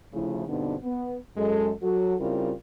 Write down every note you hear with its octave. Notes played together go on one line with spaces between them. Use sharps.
D2 C#3 F3 A3 E4
G2 B2 D3 B3 C4 D#4
B3
F#2 G#3 A4
F#3 F#4 A4
C#3 G3 C4 E4 F4 A#4